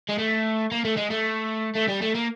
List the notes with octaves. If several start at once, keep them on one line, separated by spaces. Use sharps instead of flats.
G#3
A3
A#3
A3
G#3
A3
A3
G3
A3
A#3